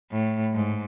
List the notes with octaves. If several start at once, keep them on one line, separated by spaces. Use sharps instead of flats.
A2
G#2